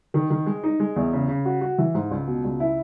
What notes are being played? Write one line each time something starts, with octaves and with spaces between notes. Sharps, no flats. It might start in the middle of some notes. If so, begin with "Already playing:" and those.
D#3
D#3
G#3
D#4
G#3
E2
C#3
C#3
F#4
F#4
E3
G#2
C#2
B2
C#2
E4